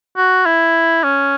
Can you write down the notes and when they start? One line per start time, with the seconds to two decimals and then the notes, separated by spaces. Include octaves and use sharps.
0.17 F#4
0.46 E4
1.03 C#4